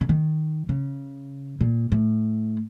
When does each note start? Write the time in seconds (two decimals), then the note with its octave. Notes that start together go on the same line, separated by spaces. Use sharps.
0.01 C#3
0.09 D#3
0.69 C#3
1.61 A#2
1.92 A2